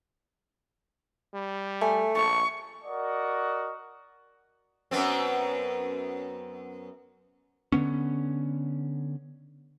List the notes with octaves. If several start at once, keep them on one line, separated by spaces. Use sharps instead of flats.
G3
A3 G#5
A#1 A5 C#6
F#4 A#4 D5 D#5 F#5
F#2 B3 C4
D3 E3 B3 C#4